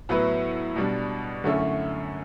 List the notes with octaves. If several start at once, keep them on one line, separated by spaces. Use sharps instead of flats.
A2 F#3 B3 E4 B4
B2 G3 D4
F#2 D3 A3 C#4 E4